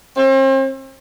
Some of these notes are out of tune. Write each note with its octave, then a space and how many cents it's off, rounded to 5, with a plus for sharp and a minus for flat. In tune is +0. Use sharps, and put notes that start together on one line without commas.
C4 +40